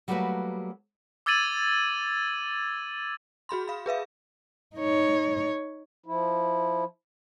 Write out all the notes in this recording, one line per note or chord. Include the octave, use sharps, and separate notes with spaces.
F#3 G3 A3 A#3 F#4 B4
D6 E6 G#6 A6 D#7 F#7
F#4 G#4 B5 C6
F5 B5
G#4 B4 E5 F5
D#4 C#5
F3 E4